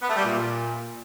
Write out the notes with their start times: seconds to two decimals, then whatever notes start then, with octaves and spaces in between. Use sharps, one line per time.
0.01 B3
0.09 A3
0.16 G3
0.24 A#2